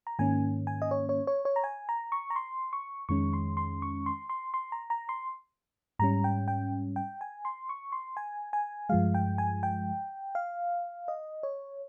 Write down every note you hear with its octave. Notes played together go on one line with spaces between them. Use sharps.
A#5
G#2 D#3 A#3 C#4 G#5
G#5
D#5
C#5
C#5
C#5
C#5
A#5
G#5
A#5
C#6
A#5
C6
C#6
F2 D#3 G#3 C#4 C#6
C6
C6
C#6
C6
C6
C6
A#5
A#5
C6
G#2 G3 C#4 A#5
G5
G5
G5
G#5
C6
C#6
C6
G#5
G#5
G2 F3 G#3 F5
G5
G#5
G5
F5
D#5
C#5